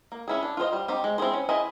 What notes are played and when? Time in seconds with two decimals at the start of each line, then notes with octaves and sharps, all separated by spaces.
0.12 A#3
0.28 C#4 E4 G#4
0.43 D4
0.57 F4 G#4 C5 D#5
0.73 G3
0.88 C4 D#4 G4
1.04 G#3
1.18 C4 E4 G#4 C5
1.33 C#4
1.49 E4 G#4 C5 D#5